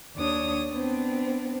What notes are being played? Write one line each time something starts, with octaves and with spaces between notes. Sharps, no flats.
D#2 D4 C#5 D#6
B3 C4 D4